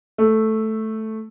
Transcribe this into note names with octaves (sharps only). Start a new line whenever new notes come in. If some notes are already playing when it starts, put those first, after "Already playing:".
A3